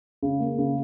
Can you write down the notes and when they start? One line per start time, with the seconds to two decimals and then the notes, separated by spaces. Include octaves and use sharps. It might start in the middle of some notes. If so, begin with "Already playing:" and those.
0.22 C#3
0.40 A#3
0.58 C#3